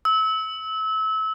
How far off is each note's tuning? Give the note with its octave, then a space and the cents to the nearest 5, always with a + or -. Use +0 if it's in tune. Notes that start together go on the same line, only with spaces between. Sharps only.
E6 -30